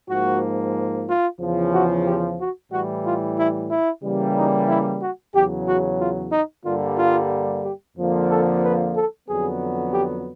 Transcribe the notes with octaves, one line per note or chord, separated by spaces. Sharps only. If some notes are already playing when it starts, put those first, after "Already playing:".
G#2 F3 A#3 F#4
F4
E2 C#3 F3
F#4
G4
F#4
A2 E3 G3 F#4
F4
E4
E4
C#3 E3 G3 A#3
D#4
E4
F#4
E2 C#3 F#3 G4
F#4
F4
D#4
G2 D3 G3 A#3 F4
F4
G4
F2 D3 F3 A#3
A4
B4
A4
F2 D3 F#3 B3 G#4
G4